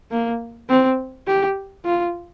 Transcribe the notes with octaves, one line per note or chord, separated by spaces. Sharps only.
A#3
C4
G4
F4